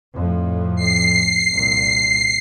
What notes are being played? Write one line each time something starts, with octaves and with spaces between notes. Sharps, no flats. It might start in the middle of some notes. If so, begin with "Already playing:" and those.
F2 A2
C7
C2 A#2